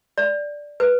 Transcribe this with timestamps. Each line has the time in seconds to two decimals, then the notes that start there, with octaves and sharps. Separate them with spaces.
0.18 D5
0.80 B4